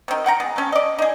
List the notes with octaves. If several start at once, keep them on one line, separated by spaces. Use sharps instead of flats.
C3 D#3
F#5 G5 A#5
B3 G#4
A3 C#4
D5 D#5
D#4 G#4